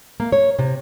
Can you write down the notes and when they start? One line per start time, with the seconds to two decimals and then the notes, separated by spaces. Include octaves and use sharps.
0.20 A#3
0.32 C#5
0.59 C3